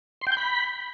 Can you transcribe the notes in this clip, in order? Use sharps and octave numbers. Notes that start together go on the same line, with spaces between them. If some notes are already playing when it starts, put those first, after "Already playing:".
C6
G5
G6
B5